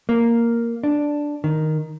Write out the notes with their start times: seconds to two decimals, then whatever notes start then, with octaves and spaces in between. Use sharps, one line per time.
0.09 A#3
0.84 D4
1.44 D#3